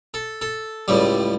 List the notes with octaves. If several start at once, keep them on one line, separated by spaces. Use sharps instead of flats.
A4
A4
C#2 A2 G3